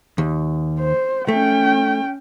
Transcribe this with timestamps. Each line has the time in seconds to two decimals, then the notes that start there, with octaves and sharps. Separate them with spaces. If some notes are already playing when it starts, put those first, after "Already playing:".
0.18 D#2
0.80 C5
1.28 A3 C#4 G5